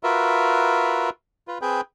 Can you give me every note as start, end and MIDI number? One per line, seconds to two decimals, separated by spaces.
0.03 1.10 65
0.03 1.10 66
0.03 1.10 70
0.03 1.10 71
0.03 1.10 76
1.48 1.58 65
1.48 1.58 71
1.62 1.81 60
1.62 1.81 68
1.62 1.81 71
1.62 1.81 79